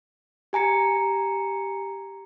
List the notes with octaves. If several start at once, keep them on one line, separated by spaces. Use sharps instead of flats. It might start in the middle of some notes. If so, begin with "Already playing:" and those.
G4 G#5 A#5 C#7